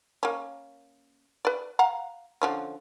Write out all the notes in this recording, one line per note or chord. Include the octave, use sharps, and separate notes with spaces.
A#3 C#4
B4 D5
F5 F#5 A#5
D3 F3 C#4